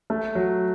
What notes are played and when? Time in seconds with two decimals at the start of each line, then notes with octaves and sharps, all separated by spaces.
0.10 A3
0.35 F#3